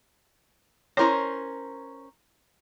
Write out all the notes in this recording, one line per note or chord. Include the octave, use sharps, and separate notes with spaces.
C#4 E4 A#4 C5 C#5